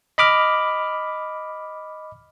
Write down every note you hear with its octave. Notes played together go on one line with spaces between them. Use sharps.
D#5 B5 D6 F6